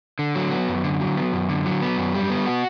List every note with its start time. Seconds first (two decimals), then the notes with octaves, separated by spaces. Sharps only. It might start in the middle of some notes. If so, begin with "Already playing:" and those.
0.19 D3
0.35 F#3
0.51 B3
0.69 F#2
0.84 D3
1.00 F#3
1.17 B3
1.33 F#2
1.49 D3
1.66 F#3
1.82 B3
1.98 F#2
2.14 G3
2.30 B3
2.47 F#4